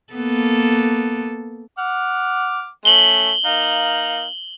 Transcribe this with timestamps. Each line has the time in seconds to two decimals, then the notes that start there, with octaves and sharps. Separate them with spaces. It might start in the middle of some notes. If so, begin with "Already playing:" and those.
0.13 A#3 B3 A4
1.79 F#5 D6 F6
2.85 A3 C#4 F#7 G7
3.45 A#3 D#4 F5